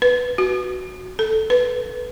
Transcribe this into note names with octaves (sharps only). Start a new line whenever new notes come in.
B4
F#4
A4
B4